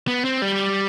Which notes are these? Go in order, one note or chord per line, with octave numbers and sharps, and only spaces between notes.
B3
C4
G3